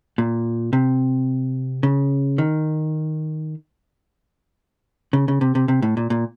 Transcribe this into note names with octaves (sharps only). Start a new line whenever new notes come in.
A#2
C3
C#3
D#3
C#3
C#3
C3
C3
C3
A2
A#2
A#2